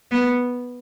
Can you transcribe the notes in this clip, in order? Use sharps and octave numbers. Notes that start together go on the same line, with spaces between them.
B3